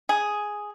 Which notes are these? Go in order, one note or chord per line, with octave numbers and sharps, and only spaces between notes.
G#4